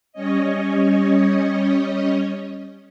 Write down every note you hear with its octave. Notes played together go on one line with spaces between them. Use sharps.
G3 C#4 C#5 D#5